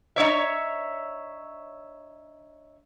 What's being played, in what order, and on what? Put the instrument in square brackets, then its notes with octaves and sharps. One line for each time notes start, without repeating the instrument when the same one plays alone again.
[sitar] D4 C#5 E5